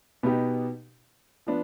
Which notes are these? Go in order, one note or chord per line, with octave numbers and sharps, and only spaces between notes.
B2 B3 D#4 G4
F3 B3 D4